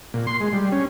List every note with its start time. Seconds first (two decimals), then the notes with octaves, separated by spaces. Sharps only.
0.14 A#2
0.27 C6
0.41 G#3
0.53 G3
0.72 C#4